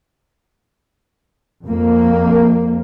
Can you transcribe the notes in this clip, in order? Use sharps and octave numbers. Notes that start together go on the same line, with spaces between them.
F2 A#3